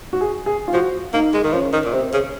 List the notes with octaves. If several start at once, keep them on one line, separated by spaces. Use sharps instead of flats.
F#4
G#4
G#4
F4
F3 F#4
A#3 D#4
G#3
D#3
F3 C#4
D#3
A#2
C3 C4
C#3